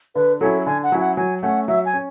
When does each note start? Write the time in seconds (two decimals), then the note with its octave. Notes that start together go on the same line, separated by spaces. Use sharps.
0.15 D3 B4
0.40 F#3 C#4 E4 A4
0.66 D3 G#5
0.83 F#5
0.92 F#3 C#4 E4
1.00 F#5
1.17 F#3 G#5
1.43 A3 C#4 F#5
1.68 F#3 E5
1.85 G#5
1.93 C#4